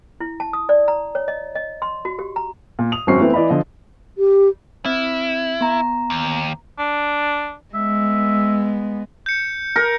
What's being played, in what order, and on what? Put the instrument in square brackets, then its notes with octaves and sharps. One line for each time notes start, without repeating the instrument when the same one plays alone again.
[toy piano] E4
A5
D#6
D5
A#5
C#5
D#5
D#5
C6
F#4
G4
A#5
[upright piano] A#2
D#6 F7
G#1 F#2 C4 C#4 F#4 C7
E3 A3 B3 C4
E3 D5 D#5 B5
D3 F3 D#5
[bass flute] G4
[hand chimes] C4 [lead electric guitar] E4
[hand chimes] B3 A#5
[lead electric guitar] D#2
[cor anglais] D4
[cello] G#3 B3 [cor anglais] E5
[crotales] G6 C#7
[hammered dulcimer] A#4